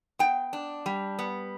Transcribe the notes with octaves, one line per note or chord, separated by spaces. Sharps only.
B3 G5
D4
G3
B3